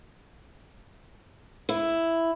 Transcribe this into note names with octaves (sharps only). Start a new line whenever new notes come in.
E4